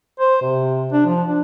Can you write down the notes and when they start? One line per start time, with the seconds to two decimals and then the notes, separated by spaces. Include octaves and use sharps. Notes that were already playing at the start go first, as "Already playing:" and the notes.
0.20 C5
0.42 C3
0.93 D4
1.06 F3
1.28 D4